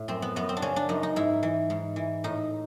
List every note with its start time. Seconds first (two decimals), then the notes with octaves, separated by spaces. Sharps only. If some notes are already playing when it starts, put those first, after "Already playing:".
Already playing: A2
0.08 F#2 C4
0.22 B3
0.36 F#2 B3
0.49 C4
0.57 D4
0.62 C#3 C#4
0.76 D4
0.89 F#2 D#4
1.03 D#4
1.16 G#2 E4
1.43 E3
1.70 G#2
1.96 E3
2.24 A2 D#4